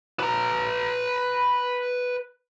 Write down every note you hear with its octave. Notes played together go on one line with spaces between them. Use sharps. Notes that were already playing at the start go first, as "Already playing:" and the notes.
B4 A#5